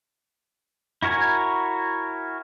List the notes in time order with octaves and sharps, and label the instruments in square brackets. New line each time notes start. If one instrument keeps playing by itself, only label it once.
[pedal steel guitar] E4 F#4 A#4 C#5 G#5